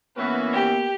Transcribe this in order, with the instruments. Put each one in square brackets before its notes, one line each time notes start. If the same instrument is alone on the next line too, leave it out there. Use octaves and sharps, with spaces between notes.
[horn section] E3 C#4 F#4 [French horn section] A#3 B3 [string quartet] B4
[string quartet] G4